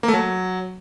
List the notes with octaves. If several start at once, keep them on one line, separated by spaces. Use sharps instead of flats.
A#3
A3
F#3